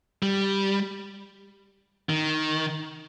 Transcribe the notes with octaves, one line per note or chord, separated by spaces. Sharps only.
G3
D#3